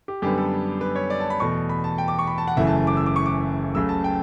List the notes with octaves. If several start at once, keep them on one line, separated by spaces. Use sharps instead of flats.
G4
F#2 D3 G3 B3 G4
A4
B4
C#5
D5
A5
B5
E2 B2 A3 C#6
B5
A5
G5
D6
C#6
B5
A5
F#5
F#1 F#2 C#3 E3 A3 E5
A5
A5
D6
E6
D6
C#6
D6
C#2 C#3 F#3 A3 E6
A5
G5